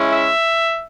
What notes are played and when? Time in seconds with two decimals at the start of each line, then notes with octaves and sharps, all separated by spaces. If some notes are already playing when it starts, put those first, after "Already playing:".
Already playing: G#3 C#4 E4
0.09 E5